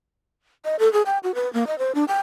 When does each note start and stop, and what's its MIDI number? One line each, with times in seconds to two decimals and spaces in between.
0.65 0.76 75
0.79 0.91 69
0.93 1.02 68
1.06 1.18 79
1.23 1.34 66
1.35 1.51 71
1.53 1.67 58
1.67 1.78 75
1.78 1.92 72
1.95 2.05 62
2.08 2.20 79